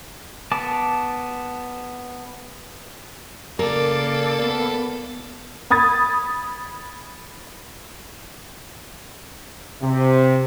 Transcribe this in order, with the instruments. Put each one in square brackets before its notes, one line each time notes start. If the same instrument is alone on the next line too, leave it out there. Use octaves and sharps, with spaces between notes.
[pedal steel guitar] B3 A5 D6
[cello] C#3 D5 [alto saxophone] A#3 [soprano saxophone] A4 [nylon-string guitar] A#4
[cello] B3 [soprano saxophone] A4
[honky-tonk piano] B5 D#6 G#6 A6
[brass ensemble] C3